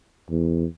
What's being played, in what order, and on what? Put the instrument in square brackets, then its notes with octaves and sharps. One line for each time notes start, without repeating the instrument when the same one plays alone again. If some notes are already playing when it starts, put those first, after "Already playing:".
[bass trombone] E2